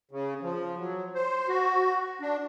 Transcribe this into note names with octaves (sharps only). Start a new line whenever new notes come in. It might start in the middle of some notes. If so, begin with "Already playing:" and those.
C#3
F3
F#3
C5
F#4
D4